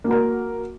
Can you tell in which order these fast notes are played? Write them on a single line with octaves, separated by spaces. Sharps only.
A#3 F#4 A#4